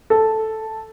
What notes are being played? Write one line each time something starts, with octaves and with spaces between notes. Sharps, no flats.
A4